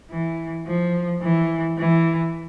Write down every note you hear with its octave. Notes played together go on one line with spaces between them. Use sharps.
E3
F3
E3
E3